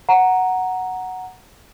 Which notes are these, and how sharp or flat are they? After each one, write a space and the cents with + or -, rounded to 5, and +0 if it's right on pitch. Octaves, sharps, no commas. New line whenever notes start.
F#5 +0 A#5 +0